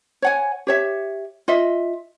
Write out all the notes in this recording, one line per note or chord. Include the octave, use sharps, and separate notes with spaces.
C#5 F#5 G#5
G4 C#5 E5
F4 D#5 E5